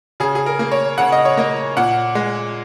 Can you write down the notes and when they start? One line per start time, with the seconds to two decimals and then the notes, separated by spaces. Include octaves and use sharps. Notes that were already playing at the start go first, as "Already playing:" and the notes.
0.20 C#3 G#4
0.35 G#4
0.46 A#4
0.59 A#3
0.72 C#5
0.98 C#3 F#5
1.12 D#5
1.25 C#5
1.37 A#3 D#5
1.77 A#2 F#5
2.15 G#3